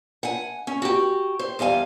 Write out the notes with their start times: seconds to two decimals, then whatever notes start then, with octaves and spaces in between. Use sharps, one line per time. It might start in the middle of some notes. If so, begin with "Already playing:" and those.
0.23 F#5 G#5
0.67 C#4
0.82 F#4 G4
1.39 C5
1.59 E2 G3 F5 G#5